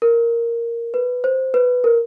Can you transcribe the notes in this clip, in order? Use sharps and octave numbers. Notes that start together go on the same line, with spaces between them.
A#4
B4
C5
B4
A#4